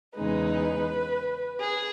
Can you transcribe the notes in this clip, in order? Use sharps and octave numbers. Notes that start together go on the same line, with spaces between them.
E2 C#3 G#3 D#4 B4
G#4